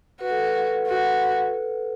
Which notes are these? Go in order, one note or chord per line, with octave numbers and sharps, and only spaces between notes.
F#4 B4
A4
B4
F#4